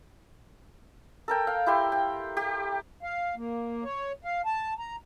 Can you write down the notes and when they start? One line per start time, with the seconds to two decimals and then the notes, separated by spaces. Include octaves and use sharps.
1.28 A4 A#4 G5
1.47 F5
1.66 E4 G4 C6
1.92 G5
2.37 G4
3.03 F5
3.36 A#3
3.84 C#5
4.24 F5
4.45 A5
4.79 A#5